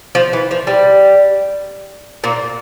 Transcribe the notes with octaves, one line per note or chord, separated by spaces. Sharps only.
F3
E3
F3
G3
A#2 A#3